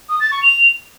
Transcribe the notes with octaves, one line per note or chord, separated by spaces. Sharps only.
D#6
A6
C#6
F7